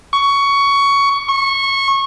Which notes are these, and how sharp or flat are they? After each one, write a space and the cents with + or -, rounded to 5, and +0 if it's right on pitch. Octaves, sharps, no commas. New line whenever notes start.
C#6 +15
C#6 -20